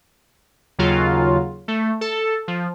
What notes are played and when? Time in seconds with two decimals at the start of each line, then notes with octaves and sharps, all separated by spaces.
0.79 D#2 C#3 F#3 F4
1.68 A3
2.01 A4
2.48 F3